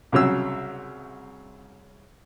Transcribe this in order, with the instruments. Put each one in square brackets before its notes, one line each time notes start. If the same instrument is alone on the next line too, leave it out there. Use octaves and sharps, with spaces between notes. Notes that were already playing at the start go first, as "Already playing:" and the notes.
[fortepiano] C2 C#3 F#3 E6